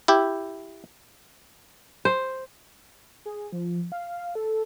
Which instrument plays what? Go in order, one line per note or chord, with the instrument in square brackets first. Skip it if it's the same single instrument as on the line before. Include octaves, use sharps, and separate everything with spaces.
[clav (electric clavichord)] E4 G4
[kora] C5
[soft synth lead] G#4
F3
F5
A4